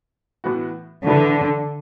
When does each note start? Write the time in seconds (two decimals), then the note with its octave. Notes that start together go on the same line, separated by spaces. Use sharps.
0.44 A2 E3 B3 F#4
1.06 A2 D3 E3 A3 E4 B4